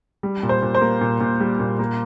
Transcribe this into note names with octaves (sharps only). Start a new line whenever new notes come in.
G3
A#2
C5
A#2
C5
A#3
A#2
A#2
G3
A#2
A#3